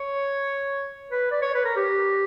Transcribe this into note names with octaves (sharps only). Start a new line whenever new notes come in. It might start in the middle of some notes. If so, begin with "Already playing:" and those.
Already playing: C#5
B4
D5
C#5
B4
A#4
G4